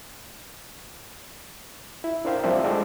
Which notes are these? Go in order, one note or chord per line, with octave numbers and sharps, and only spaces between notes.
E4
D4 A#4 C5 F5 G5
F3 G3 C4 D4 E5
G#3 D4 E4 F4 A4